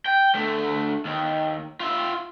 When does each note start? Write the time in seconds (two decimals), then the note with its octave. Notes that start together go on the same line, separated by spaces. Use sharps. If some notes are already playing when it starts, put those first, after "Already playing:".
0.06 G5
0.34 D2 A3
1.05 D#2
1.80 F4 E5